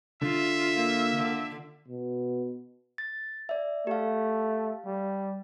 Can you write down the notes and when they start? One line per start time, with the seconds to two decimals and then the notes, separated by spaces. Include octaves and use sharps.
0.22 D3 F4 E5
0.77 A#3
1.16 D3
1.88 B2
2.98 A6
3.49 D5 E5
3.87 A3 G4 F5
4.86 G3